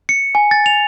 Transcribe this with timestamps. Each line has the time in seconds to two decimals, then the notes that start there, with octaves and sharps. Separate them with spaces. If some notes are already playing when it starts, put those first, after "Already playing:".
0.09 C#7
0.35 G#5
0.51 A6
0.66 F7